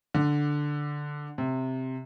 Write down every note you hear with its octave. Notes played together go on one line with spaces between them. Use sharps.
D3
C3